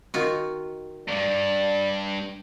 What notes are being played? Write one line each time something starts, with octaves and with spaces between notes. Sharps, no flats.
D#3 F4 F#4
E2 G2 D5